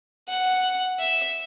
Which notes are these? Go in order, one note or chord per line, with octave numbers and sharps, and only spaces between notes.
F#5
E5